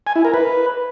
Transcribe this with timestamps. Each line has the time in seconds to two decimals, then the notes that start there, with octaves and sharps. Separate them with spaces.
0.07 G#5
0.16 E4
0.25 A#4
0.34 B4